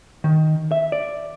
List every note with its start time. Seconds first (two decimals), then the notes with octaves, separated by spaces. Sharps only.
0.24 D#3
0.72 E5
0.92 D5